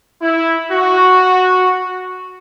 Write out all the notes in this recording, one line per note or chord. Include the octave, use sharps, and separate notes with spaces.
E4
F#4